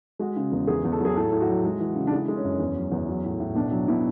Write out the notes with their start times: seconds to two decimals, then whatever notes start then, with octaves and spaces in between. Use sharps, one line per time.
0.19 G#3 F#4
0.36 C#3
0.52 E2
0.67 E2 G#4
0.85 E2
0.92 A4
1.00 F#3 G#4
1.16 A2 A4
1.32 A2
1.41 F#4
1.48 F#3
1.65 G#3
1.80 E3
1.95 C#3
2.07 D4
2.12 G#3 E4
2.28 G#3
2.36 C#4
2.44 F#2
2.59 E2
2.75 F#3
2.91 E2
3.08 F#3
3.24 A2
3.40 A2
3.55 B2 D4
3.71 F#3
3.88 B2 E4